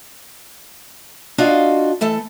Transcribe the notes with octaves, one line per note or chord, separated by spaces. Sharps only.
D4 F4 F#4 D#5 F5
E3 A3 A4